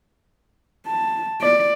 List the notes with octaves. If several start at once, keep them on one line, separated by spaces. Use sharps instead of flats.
A5
D5